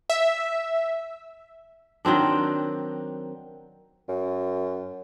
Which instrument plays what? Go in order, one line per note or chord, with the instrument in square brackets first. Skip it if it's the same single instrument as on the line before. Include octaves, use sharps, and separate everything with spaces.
[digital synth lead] E5
[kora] D#3 F#3 C4 D4
[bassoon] F#2